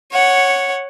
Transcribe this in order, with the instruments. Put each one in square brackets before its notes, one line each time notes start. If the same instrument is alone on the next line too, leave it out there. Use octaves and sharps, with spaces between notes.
[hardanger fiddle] C#5 F#5